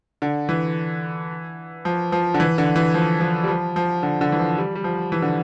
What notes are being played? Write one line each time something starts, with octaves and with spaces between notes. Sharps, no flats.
D3
E3
F3
F3
D3
E3
D3
E3
F3
F3
G3
F3
F3
D3
D3
E3
F3
G3
G3
F3
E3
D3